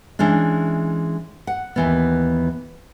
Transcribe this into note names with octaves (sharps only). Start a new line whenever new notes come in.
E3 G#3 C#4 D4
F#5
D#2 E3 B3